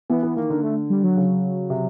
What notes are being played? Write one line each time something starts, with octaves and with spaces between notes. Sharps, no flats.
E3 B3
E3
D#3 A#3
D3
A3
G3
F#3
C#3
C3